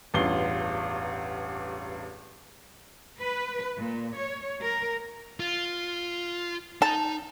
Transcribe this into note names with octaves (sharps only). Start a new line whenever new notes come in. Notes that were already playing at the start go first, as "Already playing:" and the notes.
A1 E2 G2 F4 C7 G7
B4
A#2
C#5
A#4
F4
D#4 A5 A#5